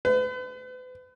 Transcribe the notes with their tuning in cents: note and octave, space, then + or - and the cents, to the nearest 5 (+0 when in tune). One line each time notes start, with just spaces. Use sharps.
B4 +40